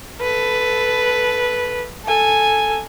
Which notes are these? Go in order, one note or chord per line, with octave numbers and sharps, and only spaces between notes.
A4 B4
A4 G#5